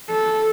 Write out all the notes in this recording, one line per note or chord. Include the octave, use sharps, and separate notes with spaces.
A4